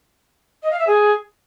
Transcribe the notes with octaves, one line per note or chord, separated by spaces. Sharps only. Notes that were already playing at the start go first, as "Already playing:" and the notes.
D#5
F5
E5
G#4